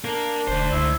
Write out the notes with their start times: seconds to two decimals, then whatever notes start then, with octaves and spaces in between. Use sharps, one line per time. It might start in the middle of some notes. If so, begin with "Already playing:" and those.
0.04 A#3 D4 A#4
0.48 E1 D2 C5
0.72 C#2 E4